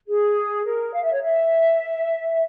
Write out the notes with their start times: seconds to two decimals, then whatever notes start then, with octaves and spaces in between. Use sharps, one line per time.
0.07 G#4
0.64 A#4
0.93 F5
1.02 E5
1.12 C#5
1.22 E5